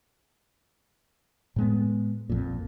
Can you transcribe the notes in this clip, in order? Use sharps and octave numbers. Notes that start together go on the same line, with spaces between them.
A2 G#3 B3
A#1 F2 A#2